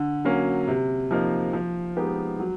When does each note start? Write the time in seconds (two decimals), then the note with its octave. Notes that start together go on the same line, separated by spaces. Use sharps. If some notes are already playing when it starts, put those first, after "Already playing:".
Already playing: D3
0.25 F#3 A#3 C#4
0.68 C3
1.11 F3 A#3 D#4
1.53 F3
1.96 G#3 B3 D#4 G4
2.40 F#3